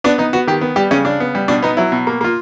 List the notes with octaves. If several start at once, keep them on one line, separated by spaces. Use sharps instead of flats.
B3 D4
B3 D#4
B3 F#4
D#3 G4
B3
G3 G4
C#3 C#4
C#3 D4
B3
G3
B2 D4
B3 D#4
F#3 E4
B2
A#3
A#3 F4